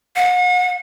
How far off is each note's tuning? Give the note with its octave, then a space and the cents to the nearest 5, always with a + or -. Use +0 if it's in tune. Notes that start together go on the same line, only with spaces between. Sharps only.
F#5 -40